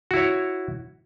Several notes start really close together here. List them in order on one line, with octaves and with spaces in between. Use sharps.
F#4 E4 C#5